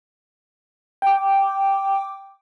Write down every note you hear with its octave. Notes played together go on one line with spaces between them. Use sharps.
G5 D6